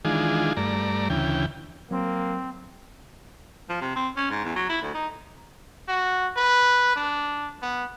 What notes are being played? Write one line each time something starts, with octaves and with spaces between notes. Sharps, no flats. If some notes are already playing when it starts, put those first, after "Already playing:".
D#3 E3 G#3 D4 F4 G#4
G2 A3 D5 A#5
D2 C#3 E3 G5
F#3 A#3 C4
F3
C3
C4
C#4
G#2
E2
F#3
E4
D2
D#4
F#4
B4
D4
B3